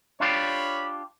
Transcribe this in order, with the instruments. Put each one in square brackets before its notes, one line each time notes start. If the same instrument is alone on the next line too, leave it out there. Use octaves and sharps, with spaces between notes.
[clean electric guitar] D4 F4 G4 [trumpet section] C#5 B5